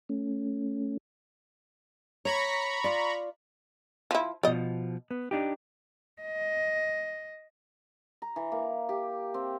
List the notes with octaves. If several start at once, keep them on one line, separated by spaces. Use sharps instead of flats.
A3 C#4
C#5 A#5 B5 C#6
F4 D5
F3 E4
B2 F3 D5 D#5
B3
D4 D#4 G4
D#5
A#5
E3
A#3
G4
C4